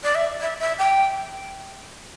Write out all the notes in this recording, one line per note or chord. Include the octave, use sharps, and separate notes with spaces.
D5
E5
E5
E5
G5